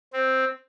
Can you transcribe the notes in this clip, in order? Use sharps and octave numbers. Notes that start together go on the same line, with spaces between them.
C4